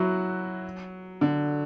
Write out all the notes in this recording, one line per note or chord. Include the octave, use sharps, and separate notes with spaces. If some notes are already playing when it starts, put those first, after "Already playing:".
Already playing: F#3 E4 F#4
D3